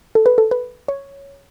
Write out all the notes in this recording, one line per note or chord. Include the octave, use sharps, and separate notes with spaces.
A4
B4
A4
B4
C#5